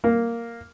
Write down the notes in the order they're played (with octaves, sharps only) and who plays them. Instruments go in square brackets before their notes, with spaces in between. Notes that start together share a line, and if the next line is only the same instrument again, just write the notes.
[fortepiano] A#3